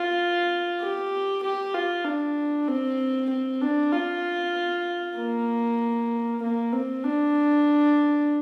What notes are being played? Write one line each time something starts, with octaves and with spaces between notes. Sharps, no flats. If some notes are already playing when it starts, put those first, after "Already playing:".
Already playing: F4
G4
G4
F4
D4
C4
C4
D4
F4
A#3
A#3
C4
D4